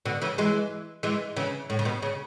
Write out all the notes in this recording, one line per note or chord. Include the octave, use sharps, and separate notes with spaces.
B2 D3
C#3 E3
E3 G#3
E3 G#3
C#3 E3
A2
C#3
B2
C#3